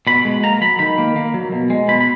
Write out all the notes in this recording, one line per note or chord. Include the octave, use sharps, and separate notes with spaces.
B2 B5
G#3
A#3 A#5
F#3 B5
D#3 B5
A#3
A#3
F#3
B2
G#3
B2 B5
B5